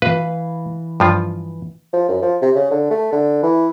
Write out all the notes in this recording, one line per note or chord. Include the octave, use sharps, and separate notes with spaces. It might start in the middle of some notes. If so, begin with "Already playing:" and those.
E3 B4 F5
G2 F3 F4
F3
F#2
F3
C3
C#3
D3
A3
D3
E3